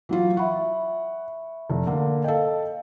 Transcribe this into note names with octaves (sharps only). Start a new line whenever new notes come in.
E3 F#3 F4
E5 F#5 B5 C#6
F1
D3 A#3
A4 D#5 F5 G5